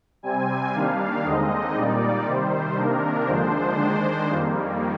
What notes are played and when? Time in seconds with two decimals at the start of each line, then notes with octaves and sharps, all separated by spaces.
0.23 C3 G3 C4 G#5
0.74 D#3 G3 A#3 D4 F5
1.24 D#2 D3 G#3 C4 D#4 D#5
1.75 A#2 G3 A#3 D#4 D5
2.26 C3 D#3 G3 C5
2.76 C3 D#3 A#3 D4 A#4
3.27 D#2 D3 F3 G#3 D4 C5
3.78 D#3 G#3 D4
4.28 F2 D#3 G3 A#3